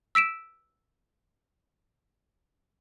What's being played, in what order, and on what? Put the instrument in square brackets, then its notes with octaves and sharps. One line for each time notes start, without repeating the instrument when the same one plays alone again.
[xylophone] E6 B6 D7 E7